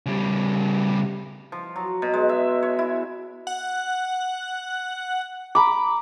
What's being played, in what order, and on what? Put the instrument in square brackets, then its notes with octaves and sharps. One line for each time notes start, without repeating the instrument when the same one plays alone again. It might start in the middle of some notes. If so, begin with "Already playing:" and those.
[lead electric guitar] C#3 G3
[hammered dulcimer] F3
F#3
B2
G#3
E5
C#5
E4
[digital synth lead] F#5
[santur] A#5 B5 D6